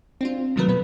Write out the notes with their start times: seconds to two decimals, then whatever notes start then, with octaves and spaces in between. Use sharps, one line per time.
0.21 C4 D4 F4
0.56 C3 D#3 F#3 A3 A#4 B4
0.68 B2 B3 B4